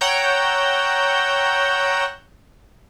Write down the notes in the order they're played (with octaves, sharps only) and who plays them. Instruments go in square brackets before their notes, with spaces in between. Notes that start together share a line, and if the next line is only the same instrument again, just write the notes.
[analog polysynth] C#5 F#5 G5 A#5 E6 G6